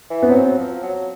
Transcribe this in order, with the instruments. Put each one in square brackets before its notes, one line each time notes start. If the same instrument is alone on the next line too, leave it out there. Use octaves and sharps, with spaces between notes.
[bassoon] E3
[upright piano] B3
[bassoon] F#3 [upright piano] C4
[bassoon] F3
F#3